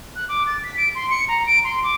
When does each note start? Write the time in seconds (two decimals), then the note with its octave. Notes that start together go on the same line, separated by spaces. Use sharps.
0.16 F#6
0.29 D6
0.47 A6
0.64 B6
0.77 D7
0.95 C6
1.10 C#7
1.28 A#5
1.47 D7
1.64 C6
1.83 D6